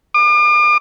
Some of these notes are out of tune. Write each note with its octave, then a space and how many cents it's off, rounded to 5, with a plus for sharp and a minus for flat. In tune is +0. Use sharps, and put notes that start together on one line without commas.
D6 +45